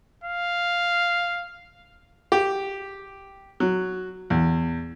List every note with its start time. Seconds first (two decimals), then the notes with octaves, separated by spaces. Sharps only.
0.24 F5
2.32 G4
3.60 F#3
4.30 E2